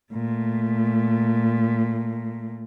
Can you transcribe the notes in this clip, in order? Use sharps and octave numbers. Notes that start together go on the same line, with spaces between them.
A#2 A3